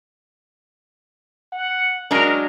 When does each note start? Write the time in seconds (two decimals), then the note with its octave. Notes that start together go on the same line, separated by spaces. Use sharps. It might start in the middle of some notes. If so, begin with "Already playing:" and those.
1.53 F#5
2.11 F#3 G#3 D4 A#4